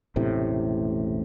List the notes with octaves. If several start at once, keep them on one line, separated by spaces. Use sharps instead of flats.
E1 A1 A2 C3